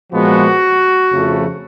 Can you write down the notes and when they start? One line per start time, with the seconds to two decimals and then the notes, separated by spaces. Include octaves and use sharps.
0.12 A#2 F3 G#3 B3 F#4
1.11 F2 C#3 F3 A3